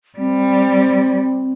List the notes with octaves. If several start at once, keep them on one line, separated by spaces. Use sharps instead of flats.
G3 C4